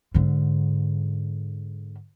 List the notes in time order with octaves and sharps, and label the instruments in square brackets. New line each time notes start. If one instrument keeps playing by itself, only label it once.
[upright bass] G#2 D3